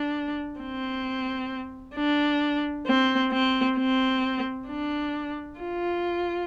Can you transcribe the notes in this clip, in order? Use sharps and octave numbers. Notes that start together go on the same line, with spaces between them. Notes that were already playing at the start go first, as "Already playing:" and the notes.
Already playing: D4
C4
D4
C4
C4
C4
D4
F4